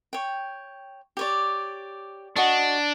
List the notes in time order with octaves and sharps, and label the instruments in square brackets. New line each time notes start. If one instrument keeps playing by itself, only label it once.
[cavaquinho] C#5 G5
G4 C#5 D5
[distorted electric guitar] D4 [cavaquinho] F#4 D#5 C#6